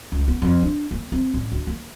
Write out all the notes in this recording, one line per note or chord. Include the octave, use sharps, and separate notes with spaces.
C#2
B3
F2
D4
A#3
C4
A1
D2
A#3